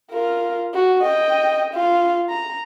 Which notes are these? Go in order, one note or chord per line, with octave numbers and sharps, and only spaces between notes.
F4 A#4
F#4
D#5 G5
F4
A#5